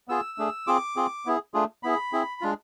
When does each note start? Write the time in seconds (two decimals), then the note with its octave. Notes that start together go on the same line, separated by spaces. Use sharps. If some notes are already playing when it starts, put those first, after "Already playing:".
0.08 B3 F4 G#4 E6
0.38 A3 D4 G#4
0.67 C4 F4 G#4 D6
0.96 C4 F4 G#4
1.26 B3 E4 G#4
1.54 A3 D4 F4 G#4
1.83 B3 E4 G#4 B5
2.13 C4 E4 G#4
2.41 G#3 D4 F4